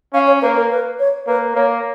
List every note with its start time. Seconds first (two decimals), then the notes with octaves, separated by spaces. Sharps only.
0.13 C#4 F5
0.27 C#5
0.42 A#3 B4
0.56 A#4
0.71 B4
0.99 C#5
1.27 A#3 B4
1.55 A#3 C#5